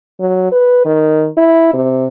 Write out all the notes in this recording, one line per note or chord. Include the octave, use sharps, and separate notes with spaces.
F#3
B4
D#3
E4
C3